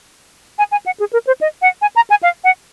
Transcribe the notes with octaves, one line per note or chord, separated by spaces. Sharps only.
G#5
G#5
F#5
G#4
A#4
C5
D#5
F#5
G#5
A#5
G#5
F5
F#5